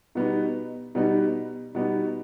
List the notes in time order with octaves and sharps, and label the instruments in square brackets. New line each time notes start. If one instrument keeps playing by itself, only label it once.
[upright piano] B2 G3 B3 D#4
B2 G3 B3 D#4
B2 G3 B3 D#4